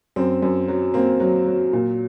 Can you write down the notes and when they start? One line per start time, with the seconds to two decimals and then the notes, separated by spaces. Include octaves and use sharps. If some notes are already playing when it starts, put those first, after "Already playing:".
0.16 F#2 C4
0.42 F#2
0.68 F#3
0.94 A#3 C4
1.20 F#3
1.47 F#3
1.73 A#2